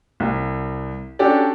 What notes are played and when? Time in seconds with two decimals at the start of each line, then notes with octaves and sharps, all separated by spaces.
0.20 C2
1.19 C#4 D4 F#4 G4 A4 D5